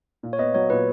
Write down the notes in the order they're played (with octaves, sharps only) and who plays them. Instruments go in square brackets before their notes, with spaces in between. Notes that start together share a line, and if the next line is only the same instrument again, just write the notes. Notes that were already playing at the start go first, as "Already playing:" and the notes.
[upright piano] A#2
[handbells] C#5
[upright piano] B3 [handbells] D#5
[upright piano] F#3 [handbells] C#5
[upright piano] A#2 [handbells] B4